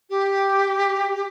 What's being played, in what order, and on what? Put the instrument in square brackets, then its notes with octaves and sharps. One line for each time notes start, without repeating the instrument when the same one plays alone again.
[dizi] G4